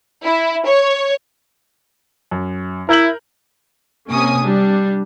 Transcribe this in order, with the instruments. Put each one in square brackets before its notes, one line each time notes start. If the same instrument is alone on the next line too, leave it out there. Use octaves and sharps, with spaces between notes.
[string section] E4
C#5
[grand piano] F#2
[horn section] E4 [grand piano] A#4 G6 F#7
[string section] C3 A#3 C#4 G#5 D#6
G3 D4